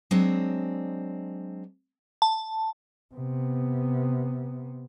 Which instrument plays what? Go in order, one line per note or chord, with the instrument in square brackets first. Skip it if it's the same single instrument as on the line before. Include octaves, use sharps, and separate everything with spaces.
[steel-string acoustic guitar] F#3 G#3 C4 D4 D#5
[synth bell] A5
[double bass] C3 B3